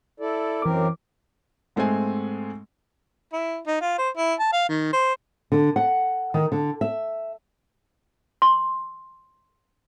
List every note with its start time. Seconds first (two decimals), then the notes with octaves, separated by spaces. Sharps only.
0.20 E4 A4 D5
0.62 F#2 E3 C4 A#4 D6
1.76 G#2 G#3 A3 C4 G#5
3.33 E4
3.67 D#4
3.82 F4
3.98 C5
4.17 E4
4.39 A5
4.53 F5
4.69 D#3
4.93 C5
5.52 D3
5.76 F#5
6.34 D#3
6.52 D3
6.81 E5
8.42 C6